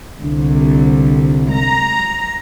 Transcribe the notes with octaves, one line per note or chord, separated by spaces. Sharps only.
C2 D3
A#5